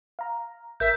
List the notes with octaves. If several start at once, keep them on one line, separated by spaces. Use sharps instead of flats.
F5 A#5
A1 A#4 E5 G6